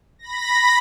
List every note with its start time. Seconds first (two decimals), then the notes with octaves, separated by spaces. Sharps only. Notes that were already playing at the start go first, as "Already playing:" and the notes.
0.19 B5 A#6